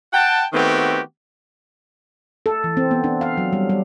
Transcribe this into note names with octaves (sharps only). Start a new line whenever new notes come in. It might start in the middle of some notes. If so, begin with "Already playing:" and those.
F#5 G5 A5
D#3 A3 B3 C4 F#4 G4
A4
E3
C4
B3
D4
F5
F#3
G3
G3